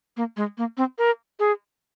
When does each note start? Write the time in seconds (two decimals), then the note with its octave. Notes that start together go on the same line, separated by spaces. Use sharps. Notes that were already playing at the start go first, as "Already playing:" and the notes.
0.17 A#3
0.37 G#3
0.58 A#3
0.77 C4
0.98 A#4
1.39 G#4